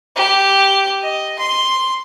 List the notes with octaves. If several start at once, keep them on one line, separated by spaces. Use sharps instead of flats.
G4
D#5
C6